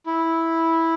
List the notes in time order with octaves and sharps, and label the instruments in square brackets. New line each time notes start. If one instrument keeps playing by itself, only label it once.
[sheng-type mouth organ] E4